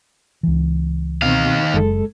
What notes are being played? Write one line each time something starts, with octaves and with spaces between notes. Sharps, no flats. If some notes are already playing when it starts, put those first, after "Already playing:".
C#2 E3
B2 D#3 C4 F5
F#1 G#3 A4